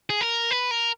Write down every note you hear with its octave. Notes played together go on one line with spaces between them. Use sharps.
G#4
A#4
B4
A#4